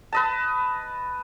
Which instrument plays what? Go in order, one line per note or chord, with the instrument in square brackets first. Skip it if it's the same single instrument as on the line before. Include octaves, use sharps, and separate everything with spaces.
[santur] B4 D#5 A5